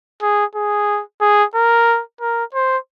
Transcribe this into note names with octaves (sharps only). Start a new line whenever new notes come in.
G#4
G#4
G#4
A#4
A#4
C5